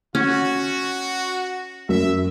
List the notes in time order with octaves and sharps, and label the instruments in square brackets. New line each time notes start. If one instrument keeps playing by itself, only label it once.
[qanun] C#4 [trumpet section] F#4
[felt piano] F#2 [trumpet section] E5